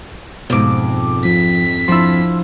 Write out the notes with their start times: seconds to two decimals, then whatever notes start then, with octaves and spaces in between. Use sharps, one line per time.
0.50 F2 G#2 B2 D6
1.25 F3 B6
1.88 F3 D4 E4 C6 E6